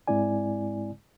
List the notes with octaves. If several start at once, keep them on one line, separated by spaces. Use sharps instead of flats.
G#2 G#3 C4 E4 D5 G#5